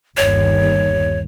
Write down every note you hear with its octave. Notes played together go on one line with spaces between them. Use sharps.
G1 D#2 C#5